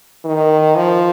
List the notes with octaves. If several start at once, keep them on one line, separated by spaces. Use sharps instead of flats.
D#3
F3